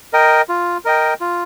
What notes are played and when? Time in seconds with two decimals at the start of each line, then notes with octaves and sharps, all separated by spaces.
0.13 A#4 D#5 G5
0.49 F4
0.85 A#4 D#5 G5
1.21 F4